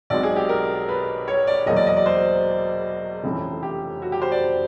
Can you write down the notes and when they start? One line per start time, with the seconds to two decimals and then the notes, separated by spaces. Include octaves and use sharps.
0.10 B1 B2 G#3 C4 D5
0.23 G#4
0.36 G4
0.49 A#4
0.89 B4
1.28 C#5
1.47 D5
1.66 E1 E2 B2 F#3 A#3 D#5
1.76 D5
1.87 D#5
1.96 D5
2.06 C5
3.24 F1 F2 C#3 E3
3.63 G4
4.02 F#4
4.12 G4
4.22 C5
4.32 D5